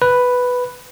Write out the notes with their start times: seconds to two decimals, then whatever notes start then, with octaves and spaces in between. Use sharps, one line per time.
0.02 B4